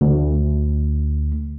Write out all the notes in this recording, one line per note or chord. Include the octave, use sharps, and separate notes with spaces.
D2